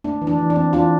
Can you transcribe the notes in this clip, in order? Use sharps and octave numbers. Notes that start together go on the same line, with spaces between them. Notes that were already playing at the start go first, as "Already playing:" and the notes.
A3 D4
E3
D4
E3
D4
C4
E3 D4 F4